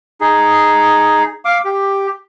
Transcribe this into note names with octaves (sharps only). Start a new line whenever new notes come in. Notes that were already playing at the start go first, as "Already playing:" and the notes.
D#4 G#4
F5 D6
G4